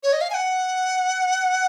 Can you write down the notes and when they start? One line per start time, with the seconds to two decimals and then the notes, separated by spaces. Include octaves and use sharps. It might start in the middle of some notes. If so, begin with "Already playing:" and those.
0.03 C#5
0.13 D#5
0.21 F5
0.30 G#5
0.34 F#5